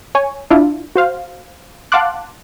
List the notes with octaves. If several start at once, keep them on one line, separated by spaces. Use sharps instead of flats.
C#5 G#5
D4 E4 F4
F#4 C5 F5
F5 F#5 A5 C6 D6 F#6